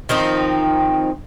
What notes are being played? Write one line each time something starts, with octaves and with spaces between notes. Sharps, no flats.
D#3 F3 C4 D#4